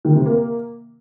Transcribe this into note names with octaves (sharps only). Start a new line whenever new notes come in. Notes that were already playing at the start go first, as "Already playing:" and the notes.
D#3
C3
A#3